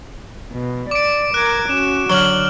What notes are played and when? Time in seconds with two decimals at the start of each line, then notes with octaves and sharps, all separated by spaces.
0.52 B2
0.91 D5 D6 D7
1.34 A#4 D6 F#6 G#6
1.69 C#4 F#4 E7
2.10 D3 F#3 F6 F#7 G7